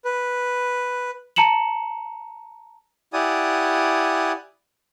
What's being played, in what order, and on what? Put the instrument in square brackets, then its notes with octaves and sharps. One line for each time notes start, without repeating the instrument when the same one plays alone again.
[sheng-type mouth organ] B4
[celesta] A5 A#5 C#7 E7 F#7
[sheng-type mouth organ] E4 G4 D5 F#5 G#5 D#6